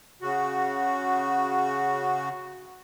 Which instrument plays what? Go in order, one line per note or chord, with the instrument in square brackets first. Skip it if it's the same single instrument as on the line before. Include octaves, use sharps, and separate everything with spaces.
[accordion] C#3 F#4